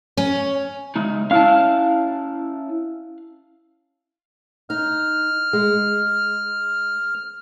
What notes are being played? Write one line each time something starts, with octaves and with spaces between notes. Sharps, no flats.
C#4
C#3 G#3 D#4
C#4 E4 F5 A5 F6
D#4 F6
G#3